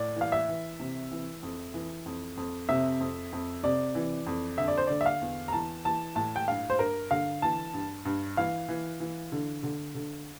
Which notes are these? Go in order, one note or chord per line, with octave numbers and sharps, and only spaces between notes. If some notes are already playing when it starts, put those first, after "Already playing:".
Already playing: A2 D5
E3 F5
E5
E3
C3
E3
F2
E3
F2
F2
C3 E5
F2
F2
C3 D5
E3
F2
D3 E5
D5
C5
D3 D5
E5
F5
E2
A#5
E3 A5
E3 A5
A2 A5
G5
G2 F5
C5
G2 A#4
D3 F5
E3 A5
G2
G2
E3 F5
E3
E3
D3
D3
D3